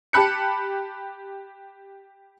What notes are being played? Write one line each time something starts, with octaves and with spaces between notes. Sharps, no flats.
G4 A5 B5 F#6 C#7